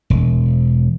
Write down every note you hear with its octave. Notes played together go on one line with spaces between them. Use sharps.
E1